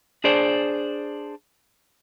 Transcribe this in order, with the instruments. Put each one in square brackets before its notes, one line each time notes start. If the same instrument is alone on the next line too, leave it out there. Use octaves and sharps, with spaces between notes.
[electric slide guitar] D4 G#4 C5 D5